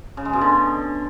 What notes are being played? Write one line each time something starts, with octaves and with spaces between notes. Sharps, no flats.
C#3
G#3
B2
D3